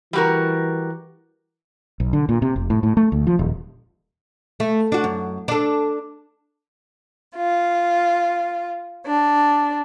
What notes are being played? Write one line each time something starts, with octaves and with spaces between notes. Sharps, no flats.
E3 G3 F#4 A#4
B1
D3
A#2
C3
F1
A2
A2
A3
D2
F3
D#1
A3
D4 F#4
F#2
D4 A4
F4
D4